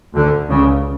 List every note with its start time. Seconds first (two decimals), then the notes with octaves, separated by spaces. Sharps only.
0.15 D2 D3
0.50 C#2 C#3